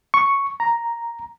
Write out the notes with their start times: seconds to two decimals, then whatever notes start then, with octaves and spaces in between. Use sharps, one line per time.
0.14 C#6
0.60 A#5